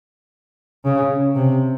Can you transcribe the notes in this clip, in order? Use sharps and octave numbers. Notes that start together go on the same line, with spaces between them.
C#3
C3